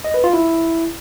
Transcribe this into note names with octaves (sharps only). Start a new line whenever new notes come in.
D#5
B4
F4
E4